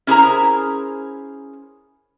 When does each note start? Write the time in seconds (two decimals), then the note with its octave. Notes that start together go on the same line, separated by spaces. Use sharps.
0.07 C#4 E4 G#4 A#4 C5 A#5